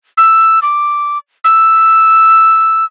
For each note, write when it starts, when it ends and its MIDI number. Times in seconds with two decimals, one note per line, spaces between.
0.17 0.59 88
0.62 1.18 86
1.44 2.84 88